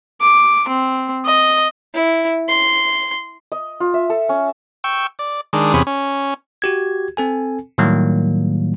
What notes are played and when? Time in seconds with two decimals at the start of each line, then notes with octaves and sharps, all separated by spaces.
0.21 D6
0.68 C4
1.25 D#5
1.94 E4
2.48 C6
3.52 D#5
3.80 F4
3.94 E5
4.10 A4
4.29 C#4
4.84 G5 C#6 E6
5.19 D5
5.53 D#3 G#3 D4
5.74 E2 C3 C#4 G#4 B5
5.87 C#4
6.62 F#4 G4 G#6
7.17 C4 A4 G#5
7.78 A2 D#3 F#3 G3 A#3